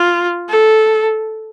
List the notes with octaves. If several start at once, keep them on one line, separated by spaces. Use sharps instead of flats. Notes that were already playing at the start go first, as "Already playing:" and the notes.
Already playing: F4
A4